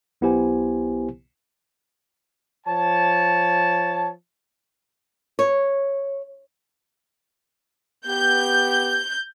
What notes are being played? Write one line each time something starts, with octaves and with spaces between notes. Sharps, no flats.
B1 B3 E4 G4 C5 G#5
F3 C#5 A5
C#5
B3 G4 G6